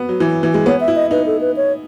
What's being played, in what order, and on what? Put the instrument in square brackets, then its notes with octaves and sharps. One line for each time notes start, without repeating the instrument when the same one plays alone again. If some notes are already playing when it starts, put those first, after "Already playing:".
Already playing: [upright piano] B3
F#3
E3
E3
G#3
[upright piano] B3 [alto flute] C#5
[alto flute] E5
[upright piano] E4
[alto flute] D#5
[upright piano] D#4 [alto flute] B4
[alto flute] A4
B4
C#5